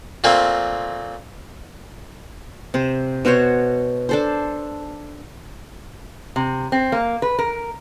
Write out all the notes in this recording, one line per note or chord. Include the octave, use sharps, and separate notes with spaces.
A#2 A3 A#3 C4
C3 C5
B2 F#4 C5 C#5
D4 A4 C5
C3
C4
A#3
B4
A#4